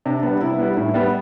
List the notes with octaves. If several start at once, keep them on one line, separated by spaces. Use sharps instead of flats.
C3 D4
G3 B3
C3 E4
G3 B3
A2
G3 B3